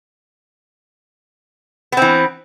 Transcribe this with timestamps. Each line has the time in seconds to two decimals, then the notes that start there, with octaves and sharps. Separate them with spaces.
1.92 B3
1.97 C4
2.02 E3